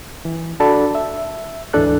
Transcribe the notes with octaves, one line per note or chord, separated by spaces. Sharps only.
E3
D4 F#4 A4 D5 A5 B5
E5
D2 G#2 E3 D4 A4 F#6